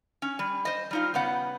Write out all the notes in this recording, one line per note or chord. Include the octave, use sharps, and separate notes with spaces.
C#4
G3
C5 D#5
G3 D#4 F4
C#3 G3 B3 F#5